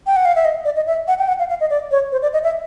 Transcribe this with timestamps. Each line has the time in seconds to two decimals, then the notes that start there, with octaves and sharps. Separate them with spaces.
0.07 G5
0.16 F#5
0.25 F5
0.36 E5
0.45 D#5
0.65 D5
0.76 D#5
0.87 E5
1.08 F#5
1.19 G5
1.28 F#5
1.39 F5
1.49 F5
1.61 D#5
1.70 D5
1.91 C#5
2.12 C5
2.22 D5
2.33 D#5
2.44 E5